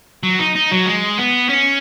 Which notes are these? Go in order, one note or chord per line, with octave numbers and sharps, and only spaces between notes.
F#3
D#4
D#4
F#3
G#3
B3
C#4